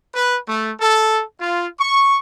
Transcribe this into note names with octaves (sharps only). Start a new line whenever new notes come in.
B4
A3
A4
F4
C#6